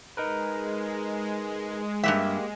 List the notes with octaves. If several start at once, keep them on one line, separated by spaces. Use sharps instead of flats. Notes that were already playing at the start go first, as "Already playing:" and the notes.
G#3 D#4 A#4 B4
G2 E3 A#3 G4 E5